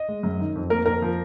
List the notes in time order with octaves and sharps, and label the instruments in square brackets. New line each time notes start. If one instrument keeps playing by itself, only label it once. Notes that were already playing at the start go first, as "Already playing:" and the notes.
Already playing: [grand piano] D#5
G#3
F#2
D#3
F2
A#3 A#4
F2 A#4
F3